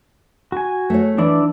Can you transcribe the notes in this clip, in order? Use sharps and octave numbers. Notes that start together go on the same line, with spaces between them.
F#4 G#5
A3 C#5
E3 D4 E4 D5